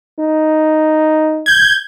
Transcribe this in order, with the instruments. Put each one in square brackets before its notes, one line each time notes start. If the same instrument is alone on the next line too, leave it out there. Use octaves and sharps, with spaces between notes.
[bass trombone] D#4
[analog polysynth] G6 G#6